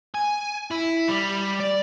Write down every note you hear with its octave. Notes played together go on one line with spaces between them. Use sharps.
G#5
E4
G3
D5